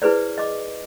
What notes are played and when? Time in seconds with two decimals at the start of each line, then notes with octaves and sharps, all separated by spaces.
0.02 E4 G#4 B4 C5 D5
0.38 D#5 D6